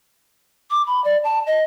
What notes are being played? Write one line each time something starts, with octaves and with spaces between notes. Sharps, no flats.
D6
B5
D5
A5
D#5